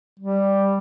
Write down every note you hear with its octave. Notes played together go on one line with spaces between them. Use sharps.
G3